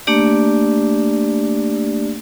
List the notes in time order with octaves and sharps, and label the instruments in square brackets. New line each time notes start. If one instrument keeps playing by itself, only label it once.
[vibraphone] A3 A#3 D4 G4 D5